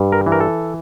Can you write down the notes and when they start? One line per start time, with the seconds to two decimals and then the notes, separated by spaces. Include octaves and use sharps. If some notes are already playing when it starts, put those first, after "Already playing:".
Already playing: G2
0.12 A#4
0.26 E3
0.32 A#4
0.41 A4